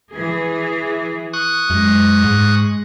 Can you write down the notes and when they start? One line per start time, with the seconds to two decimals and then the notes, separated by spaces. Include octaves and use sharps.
0.14 E3 G#4
1.33 C#6 D#6 F#6
1.70 F#2 G#3
2.24 G#2